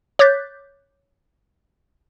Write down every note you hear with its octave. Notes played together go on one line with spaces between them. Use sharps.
C#5 D6 F#6 G6 A6 B6